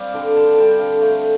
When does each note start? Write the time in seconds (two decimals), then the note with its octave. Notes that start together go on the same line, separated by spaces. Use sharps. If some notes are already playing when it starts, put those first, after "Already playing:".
Already playing: G3 C4 D5 F5
0.14 D3 G5
0.36 D3 A5
0.58 G3 G5
0.79 D3 F5
1.02 A3